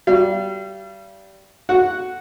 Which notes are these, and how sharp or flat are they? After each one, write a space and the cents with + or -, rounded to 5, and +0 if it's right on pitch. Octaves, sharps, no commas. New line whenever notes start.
G3 -20 F5 -40
F#4 +0 F#5 +0